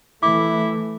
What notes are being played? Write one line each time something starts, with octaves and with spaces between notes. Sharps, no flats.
E3 A3 E4 D6